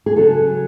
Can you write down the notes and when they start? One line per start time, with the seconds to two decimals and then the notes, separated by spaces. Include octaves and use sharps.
0.06 G#4
0.16 C#3 F#3 A4